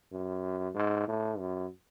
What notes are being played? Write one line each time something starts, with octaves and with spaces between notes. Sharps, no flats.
F#2
G#2
A2
F#2